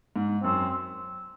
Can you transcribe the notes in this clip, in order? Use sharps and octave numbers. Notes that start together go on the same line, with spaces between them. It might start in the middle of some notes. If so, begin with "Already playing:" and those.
G#2
F#2 C4